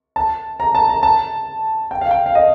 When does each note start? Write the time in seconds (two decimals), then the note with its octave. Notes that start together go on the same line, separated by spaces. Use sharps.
0.16 A5
0.60 A#5
0.75 A5
0.89 A#5
1.03 A5
1.91 G5
2.01 F5
2.11 G5
2.26 F5
2.35 D#5